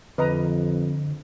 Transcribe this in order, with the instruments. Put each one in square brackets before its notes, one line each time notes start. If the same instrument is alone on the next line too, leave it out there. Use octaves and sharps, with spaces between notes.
[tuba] F2 [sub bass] D3 [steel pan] B4 D#5 A#5